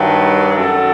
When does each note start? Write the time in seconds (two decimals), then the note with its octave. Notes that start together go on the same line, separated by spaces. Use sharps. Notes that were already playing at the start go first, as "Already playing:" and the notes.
Already playing: G2 D#3 F#3
0.56 F#2 D#3 F#3 A4